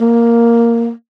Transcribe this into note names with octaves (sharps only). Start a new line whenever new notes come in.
A#3